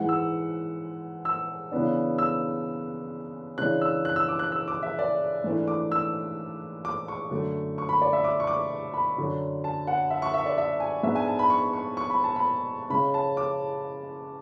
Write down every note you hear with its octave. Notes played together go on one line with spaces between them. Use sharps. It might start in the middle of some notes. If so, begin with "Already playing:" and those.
Already playing: G#2 E3 G#3 F#5
E6
E6
C#3 E3 B3 D4
E6
C#3 E3 G#3 D4 F#6
E6
F#6
E6
D6
F#6
E6
D6
E5
D5
G#2 E3 A3 D4
D6
E6
D6
C#6
F#2 D3 A3
C#6
B5
D5
E5
D6
C#6
D6
B5
F#2 D3 F#3
A5
F#5
E5
C#6
E5
D5
E5
G#5
G#2 G#3 B3 D4 E5
G#5
A5
B5
C#6
C#6
C#6
B5
A5
B5
C#3 G#3 C#4 B5
A5
D6